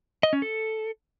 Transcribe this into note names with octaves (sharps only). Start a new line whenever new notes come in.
D#5
C#4
A4